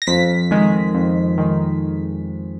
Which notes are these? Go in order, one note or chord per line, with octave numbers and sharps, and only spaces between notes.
A#6
F2 B6
D#3 G#3
F2
D#3 G#3